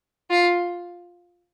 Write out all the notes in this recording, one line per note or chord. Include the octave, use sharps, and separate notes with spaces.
F4